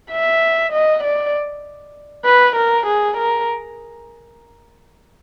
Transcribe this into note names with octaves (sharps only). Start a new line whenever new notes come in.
E5
D#5
D5
B4
A#4
G#4
A#4